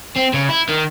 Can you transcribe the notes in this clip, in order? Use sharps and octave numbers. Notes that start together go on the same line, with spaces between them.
C4
C#3
E4
D#3